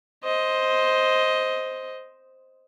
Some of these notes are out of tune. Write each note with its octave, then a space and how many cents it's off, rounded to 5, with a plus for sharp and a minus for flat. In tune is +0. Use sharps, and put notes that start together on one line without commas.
C5 +0 D#5 +10